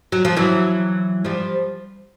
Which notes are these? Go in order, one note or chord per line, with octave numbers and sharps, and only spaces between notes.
F#3
F3
E3 F#3
F3 G3